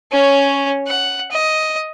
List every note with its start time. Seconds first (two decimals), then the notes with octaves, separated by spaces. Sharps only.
0.11 C#4 C#5
0.87 F#5
1.31 D#5